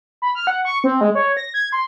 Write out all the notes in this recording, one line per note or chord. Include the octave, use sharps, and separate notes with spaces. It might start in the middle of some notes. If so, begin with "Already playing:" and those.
B5
F6
F#5
C#6
C4
G#3
C#5
A#6
G#6
C6